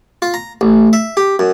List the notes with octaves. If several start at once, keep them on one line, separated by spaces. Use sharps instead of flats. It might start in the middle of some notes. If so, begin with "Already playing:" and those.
F4
A#5
A1
E5
G4
F#2